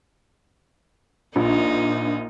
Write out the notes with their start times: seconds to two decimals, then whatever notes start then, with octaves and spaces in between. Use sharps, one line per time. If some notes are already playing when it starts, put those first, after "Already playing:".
1.36 A#1 A#3 D4 D#4 F4